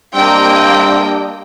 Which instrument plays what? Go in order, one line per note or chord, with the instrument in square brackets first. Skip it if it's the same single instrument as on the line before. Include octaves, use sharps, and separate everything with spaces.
[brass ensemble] G3 D4 [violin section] A#3 D#5 G5 [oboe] C4